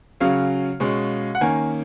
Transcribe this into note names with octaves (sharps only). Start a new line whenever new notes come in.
C#3 F#3 C#4 F5
B2 G#3 C#4
F#5
D#3 A#3 C#4 G#5